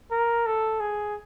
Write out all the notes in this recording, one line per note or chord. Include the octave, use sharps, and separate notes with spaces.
A#4
A4
G#4